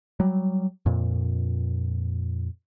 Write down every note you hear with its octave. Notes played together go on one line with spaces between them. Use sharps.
F#3 G3
F2 A#2